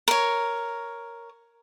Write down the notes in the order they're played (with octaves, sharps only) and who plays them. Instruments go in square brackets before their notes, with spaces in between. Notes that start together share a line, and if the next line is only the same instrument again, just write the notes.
[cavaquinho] A#4 C#5